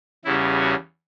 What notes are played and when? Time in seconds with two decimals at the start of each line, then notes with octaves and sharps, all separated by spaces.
0.25 E2 C#3 G3 C#4 E4
0.60 F#4